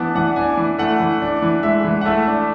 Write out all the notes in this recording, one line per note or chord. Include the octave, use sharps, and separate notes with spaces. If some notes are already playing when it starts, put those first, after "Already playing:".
Already playing: E3 B3 D4 D5 A5
E3 F#5
D4 G#5
E3
A3 F#5
E3
D4
E3
G#3 E5
E3
F#5
A3 E5
D4